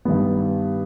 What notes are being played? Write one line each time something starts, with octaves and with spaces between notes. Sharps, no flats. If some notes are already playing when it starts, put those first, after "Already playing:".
G2 D#3 G3 B3